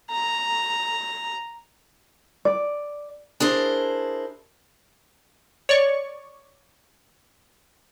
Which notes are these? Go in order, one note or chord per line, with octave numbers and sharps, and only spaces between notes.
A#5
D5
D4 E4 G#4 A#4 C5
C#5 D5 C#6